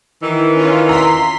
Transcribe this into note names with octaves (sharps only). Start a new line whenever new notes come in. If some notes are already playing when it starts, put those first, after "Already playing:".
D#3 E3
C#4 F4
A#5 C6 B6